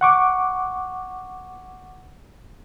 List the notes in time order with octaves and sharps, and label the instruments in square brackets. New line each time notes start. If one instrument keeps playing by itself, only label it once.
[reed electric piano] F#5 C#6 D6